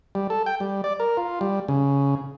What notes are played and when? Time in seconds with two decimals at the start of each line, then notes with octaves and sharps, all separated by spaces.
0.15 G3
0.30 A4
0.46 G5
0.60 G3
0.84 D5
1.00 A#4
1.17 F4
1.41 G3
1.68 C#3